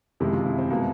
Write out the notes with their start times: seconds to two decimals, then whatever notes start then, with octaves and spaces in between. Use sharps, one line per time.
0.20 F#1 F2 C3 D#3 G#3 E4
0.33 F4
0.45 E4
0.58 C4
0.70 B2 G#3 A#3